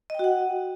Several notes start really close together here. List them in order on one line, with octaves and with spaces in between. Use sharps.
D#5 G5 F#4 F#5